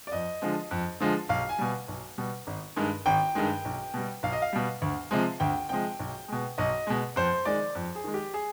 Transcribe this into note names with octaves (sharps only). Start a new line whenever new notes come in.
D5
F2 D#5
D3 F3 G#3
F2
D3 F3 G#3
B1 F5
G#5
B2 G3
B1
B2 G3
G#1
G2 D#3 G#3
G#1 G5
G2 D#3 G#3
B1
B2 G3
B1 F5
D#5
F5
B2 G3
D2
C3 F3 G#3
D2 G5
C3 F3 G#3 G5
B1
B2 G#3
B1 D#5
B2 G#3
F2 C5
D#3 G#3 D5
F2
G#4
D#3 G#3
G4
G#4